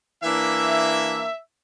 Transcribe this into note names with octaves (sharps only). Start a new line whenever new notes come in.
E3 A#3 D4 E5